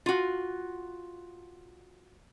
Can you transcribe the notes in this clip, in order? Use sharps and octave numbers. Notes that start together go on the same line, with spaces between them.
F4 F#4